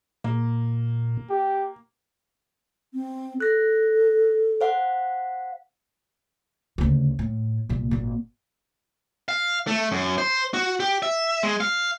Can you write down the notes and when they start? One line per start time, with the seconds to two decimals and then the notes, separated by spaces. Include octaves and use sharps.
0.24 A#2 A#3
1.30 G4
2.93 C4
3.40 A4 F#6 A#6
4.61 C5 F5 F#5
6.78 D2 C#3
7.19 A2
7.69 C2 A#2
7.91 G#1 A#2
9.29 F5
9.67 A3
9.92 F#2
10.18 C5
10.54 F#4
10.80 G4
11.03 E5
11.43 G#3
11.60 F5